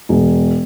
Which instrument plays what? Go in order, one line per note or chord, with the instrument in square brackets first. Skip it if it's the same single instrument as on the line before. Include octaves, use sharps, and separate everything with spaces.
[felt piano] E1